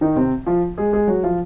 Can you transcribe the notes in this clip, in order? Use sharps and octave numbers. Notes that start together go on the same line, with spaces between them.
D#3 D#4
C3 C4
F3 F4
G#3 G#4
G#3 G#4
F#3 F#4
F3 F4